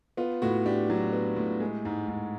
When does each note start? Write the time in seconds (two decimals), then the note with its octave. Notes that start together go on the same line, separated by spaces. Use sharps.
0.17 B3 F4
0.42 A2 F#4
0.66 D4 G4
0.90 F#3
1.13 B3
1.36 A2
1.60 G#3
1.85 G#2
2.08 G#2